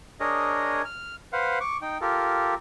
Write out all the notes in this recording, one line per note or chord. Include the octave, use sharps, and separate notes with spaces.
D4 G#4 A#4 C#5 D#5
F6
B4 C5 F5 F#5
C#6 D6
D#4 G5
F4 G4 A4 A#4